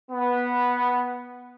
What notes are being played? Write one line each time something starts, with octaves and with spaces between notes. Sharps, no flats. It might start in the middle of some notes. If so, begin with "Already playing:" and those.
B3